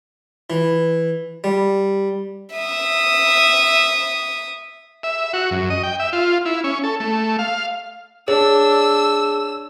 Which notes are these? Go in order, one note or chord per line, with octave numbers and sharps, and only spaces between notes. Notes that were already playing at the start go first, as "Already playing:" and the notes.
E3
G3
E5 D#6
E5
F#4
F#2
D#5
G5
E5
F4
E4
C#4
A4
A3
F5
D4 G#4 C#5 E6